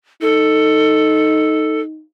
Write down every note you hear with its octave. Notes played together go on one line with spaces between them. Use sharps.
D#4 A4